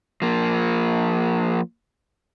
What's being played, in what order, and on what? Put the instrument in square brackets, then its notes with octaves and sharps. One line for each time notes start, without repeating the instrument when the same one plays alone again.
[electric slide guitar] F3 A#3